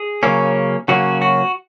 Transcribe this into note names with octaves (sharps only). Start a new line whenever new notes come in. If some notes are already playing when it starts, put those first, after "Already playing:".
Already playing: G#4
C#3 F#3 A#3 C#4
C#3 F#3 A#3 C#4 F#4
F#4